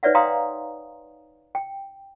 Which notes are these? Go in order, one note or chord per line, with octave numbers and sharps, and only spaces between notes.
D#4 B4 C#5 D5 E5 F#5
F5 G5 A#5 C6 D#6
G5